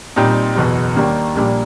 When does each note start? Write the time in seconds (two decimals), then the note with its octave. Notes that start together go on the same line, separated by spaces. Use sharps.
0.16 A#2 G3 C4 D#4
0.55 F#1 E2 B2
0.96 D#2 D#3 G3 A#3 D4
1.35 A#1 A#2 G3 A#3 D4